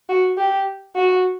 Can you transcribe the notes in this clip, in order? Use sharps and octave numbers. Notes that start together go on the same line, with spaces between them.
F#4
G4
F#4